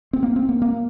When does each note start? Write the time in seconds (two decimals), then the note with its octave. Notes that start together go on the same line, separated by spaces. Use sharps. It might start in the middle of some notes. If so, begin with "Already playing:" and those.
0.13 C4
0.23 A#3
0.36 C4
0.49 A#3
0.62 A#3